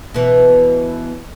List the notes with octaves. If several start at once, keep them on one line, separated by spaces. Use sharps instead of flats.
B2 E3